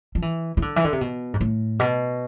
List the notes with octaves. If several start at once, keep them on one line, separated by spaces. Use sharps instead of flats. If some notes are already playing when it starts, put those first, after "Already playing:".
F3
E3
E3
D3
E3
D3
C3
B2
G#2
A2
B2